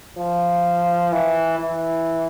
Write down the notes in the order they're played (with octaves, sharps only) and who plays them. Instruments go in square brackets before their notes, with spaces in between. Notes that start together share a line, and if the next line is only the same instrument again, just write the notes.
[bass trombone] F3
E3
E3